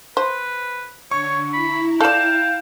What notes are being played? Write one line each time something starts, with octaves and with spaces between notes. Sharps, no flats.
B4 C5
D3 C#5 C#6
E4 A#5 B5
A4 D5 F5 G5 E7